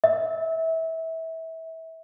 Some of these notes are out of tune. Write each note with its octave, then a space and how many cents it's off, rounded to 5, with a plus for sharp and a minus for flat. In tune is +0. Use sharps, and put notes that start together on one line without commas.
E5 -25